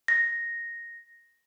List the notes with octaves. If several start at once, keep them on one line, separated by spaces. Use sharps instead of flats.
A#6